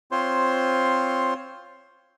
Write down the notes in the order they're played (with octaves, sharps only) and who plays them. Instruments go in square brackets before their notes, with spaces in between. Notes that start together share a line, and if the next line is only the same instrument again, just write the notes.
[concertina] C4 F4 C5 C#5 C6